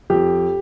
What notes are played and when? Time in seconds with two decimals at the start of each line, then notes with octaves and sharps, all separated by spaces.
0.10 F2 G4